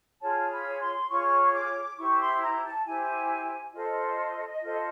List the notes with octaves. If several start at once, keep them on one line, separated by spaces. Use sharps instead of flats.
F4 G#4 C#5 A5
B5
C6
F4 G#4 C#5 C#6
D6
E4 G4 C5 C#6
C6
A#5
A5
E4 G4 C5 G#5
F4 A4 C5 D#5
F4 A4 C5